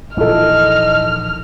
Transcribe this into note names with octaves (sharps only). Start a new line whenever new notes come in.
A#1 D#3 E3 E4 A4 D#5 F6